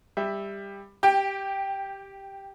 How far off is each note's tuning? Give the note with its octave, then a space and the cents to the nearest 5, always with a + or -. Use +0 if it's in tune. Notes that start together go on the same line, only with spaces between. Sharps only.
G3 +20 E5 +0
G4 +0 G5 +20